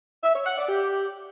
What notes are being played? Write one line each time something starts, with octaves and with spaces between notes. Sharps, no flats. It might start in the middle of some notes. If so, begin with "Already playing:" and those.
E5
C#5
F#5
D5
G4